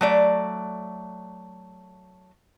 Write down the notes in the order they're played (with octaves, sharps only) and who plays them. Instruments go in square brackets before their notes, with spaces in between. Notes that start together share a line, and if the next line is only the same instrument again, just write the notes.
[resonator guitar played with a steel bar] F#3 A3 D5